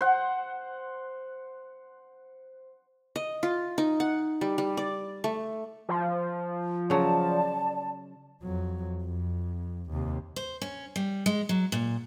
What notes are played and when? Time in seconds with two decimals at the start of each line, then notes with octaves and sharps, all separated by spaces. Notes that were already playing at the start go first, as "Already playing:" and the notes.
0.01 C5 F#5
3.16 D#5
3.43 F4
3.78 D#4
4.00 F#5
4.41 G3
4.58 G3
4.77 D5
5.24 A3
5.89 F3
6.90 C#3 F#3 D5 A5
8.42 F2 F#3
9.03 F2
9.91 D#2 C3
10.36 C5
10.61 C#4
10.96 G3
11.26 G#3
11.49 F#3
11.72 A#2